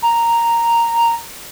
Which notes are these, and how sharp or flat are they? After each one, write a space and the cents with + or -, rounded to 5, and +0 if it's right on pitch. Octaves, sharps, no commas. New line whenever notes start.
A#5 -5